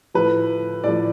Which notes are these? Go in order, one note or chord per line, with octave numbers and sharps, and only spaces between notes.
A2 F3 B4
A2 F3 D5